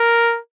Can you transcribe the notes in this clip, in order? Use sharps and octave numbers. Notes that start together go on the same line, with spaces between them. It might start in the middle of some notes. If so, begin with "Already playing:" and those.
Already playing: A#4